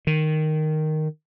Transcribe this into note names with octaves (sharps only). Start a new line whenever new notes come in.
D#3